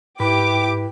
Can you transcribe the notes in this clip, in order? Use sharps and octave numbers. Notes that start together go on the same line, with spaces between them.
G#2 E4 G4 B4 D6